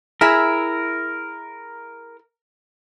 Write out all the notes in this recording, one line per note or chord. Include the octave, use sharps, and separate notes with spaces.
E4 G#4 A#4 E5